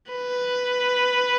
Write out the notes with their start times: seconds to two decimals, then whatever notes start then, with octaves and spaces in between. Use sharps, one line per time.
0.12 B4